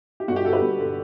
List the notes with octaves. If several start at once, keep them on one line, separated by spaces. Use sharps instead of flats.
G4
G1 F#4
G4
G2 D3 F#4 A4
G4 B4
G1
G2 D3